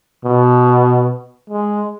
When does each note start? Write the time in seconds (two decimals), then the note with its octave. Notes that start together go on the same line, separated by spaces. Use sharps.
0.25 B2
1.50 G#3